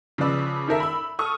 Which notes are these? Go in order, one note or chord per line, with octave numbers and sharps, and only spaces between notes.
C#3 F3 B4 D5 E6
D#3 A4 A#4 E5
B5 E6
A4 C#6 D#6 F6